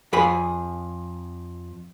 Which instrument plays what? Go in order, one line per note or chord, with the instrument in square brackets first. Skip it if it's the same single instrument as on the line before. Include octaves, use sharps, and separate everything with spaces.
[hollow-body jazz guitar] F2 G#4 B5